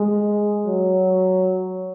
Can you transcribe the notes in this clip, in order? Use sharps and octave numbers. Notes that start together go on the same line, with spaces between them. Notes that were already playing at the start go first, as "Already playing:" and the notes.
Already playing: G#3
F#3